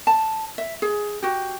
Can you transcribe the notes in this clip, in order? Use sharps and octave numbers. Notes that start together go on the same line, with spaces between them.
A5
E5
G#4
F#4 G4